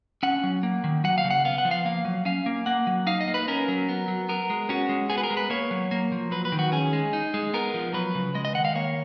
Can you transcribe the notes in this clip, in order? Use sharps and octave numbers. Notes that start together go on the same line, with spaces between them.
C#4 F#5
F#3
A#3
D#3
F#3 F#5
F5
C#3
F#5
B3 F5
F#5
F3
F5
A#3 F5
F#3
C#4 F5
A#3
A#3 F#5
F#3
D#4 F5
D#5
A#3
B4
C#4 A#4
F#3
B3
F#3
B3 A#4
G#3
C#4 F#4
G#3
B3 G#4
B4
A#4
G#3
B4
A#3 C#5
F#3
A#3
F3
F#3 B4
B4
D#3
F#4
C#4 G#4
G#3
D#4
G#3
B3 A#4
F3
F#3 B4
C#3
G#3 D#5
D#5
D#3 F#5
F5
A#3 C#5